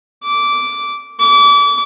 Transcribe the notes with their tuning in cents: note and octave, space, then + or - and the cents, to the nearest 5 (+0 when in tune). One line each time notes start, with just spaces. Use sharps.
D6 -10
D6 -35